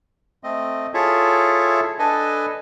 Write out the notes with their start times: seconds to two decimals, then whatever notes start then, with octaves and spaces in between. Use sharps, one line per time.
0.44 A3 C4 D#5
0.94 E4 F4 G#4 A4 C#5 E5
1.99 D4 A4 B4 D#5 G#5